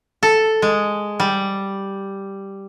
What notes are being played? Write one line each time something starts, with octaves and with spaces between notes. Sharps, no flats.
A4
G#3
G3